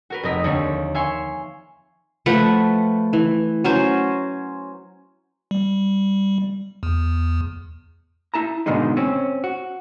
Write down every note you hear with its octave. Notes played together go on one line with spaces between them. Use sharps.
F#4 A#4 B4
F1 C4 A#4 D#5 B6
D#2 D3 C4 F4 C#5
E5 F5 G#5 C6 C#6
F3 A3 B4 F#5
E3
F#3 C#4 C5
G3
E2
E4 A5 A#5
G#2 B2 D3 D#3 G#3 D#4
C4 C#4
F#4